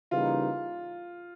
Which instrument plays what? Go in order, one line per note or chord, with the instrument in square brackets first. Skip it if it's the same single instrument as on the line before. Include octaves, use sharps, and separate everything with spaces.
[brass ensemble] C#3 E3 G3 A#3 D#4 [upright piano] F4